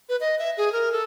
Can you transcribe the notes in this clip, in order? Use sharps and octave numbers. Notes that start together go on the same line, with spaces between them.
B4
D#5
E5
G#4
A#4
A4